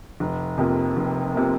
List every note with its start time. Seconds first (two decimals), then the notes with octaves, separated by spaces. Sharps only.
0.20 F1
0.58 F2 C3 F3 A#3
0.97 F1
1.35 C3 F3 A#3